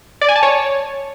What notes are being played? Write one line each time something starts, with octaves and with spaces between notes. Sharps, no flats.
D5
G#5
A5
C#5